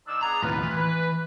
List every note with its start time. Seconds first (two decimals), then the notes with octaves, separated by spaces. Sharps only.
0.08 D#3 D4 E6
0.23 B3 D4 G#4 A#5
0.43 D#2 A2 F4 B4
0.63 E3
0.77 B4